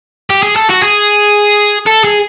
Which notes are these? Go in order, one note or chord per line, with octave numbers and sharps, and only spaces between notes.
G4
G#4
A4
F#4
G#4
A4
G#4